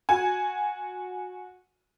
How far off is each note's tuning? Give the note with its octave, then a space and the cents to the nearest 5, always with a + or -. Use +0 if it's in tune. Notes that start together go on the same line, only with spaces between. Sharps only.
F#4 -20 G#5 +0